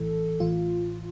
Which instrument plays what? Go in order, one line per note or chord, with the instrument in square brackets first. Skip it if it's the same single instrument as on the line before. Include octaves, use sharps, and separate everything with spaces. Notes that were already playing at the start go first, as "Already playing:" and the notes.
Already playing: [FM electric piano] A#1 A2 E3 A4
A1 A2 E3 F4